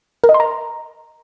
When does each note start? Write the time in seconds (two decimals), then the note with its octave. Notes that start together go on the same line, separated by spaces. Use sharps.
0.24 A#4
0.29 D#5
0.34 C6
0.40 A#5